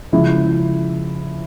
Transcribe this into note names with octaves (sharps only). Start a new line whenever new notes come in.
C#3 F3 G#3 E4